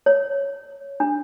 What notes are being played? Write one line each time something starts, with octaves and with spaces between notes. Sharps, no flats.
C#5
D4